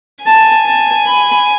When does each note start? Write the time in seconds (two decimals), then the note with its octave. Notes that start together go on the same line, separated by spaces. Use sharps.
0.25 G#5 A5
0.66 A5
1.06 B5